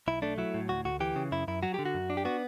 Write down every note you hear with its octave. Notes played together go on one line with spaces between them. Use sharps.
B1 E4
A3 D4
F#3 E4
A2
D2 F#4
D2 F#4
E3 G4
C#3
F#2 E4
F#2 E4
F#3 F#4
D3 G4
F#4
F#2
D4
G4
B3 F#4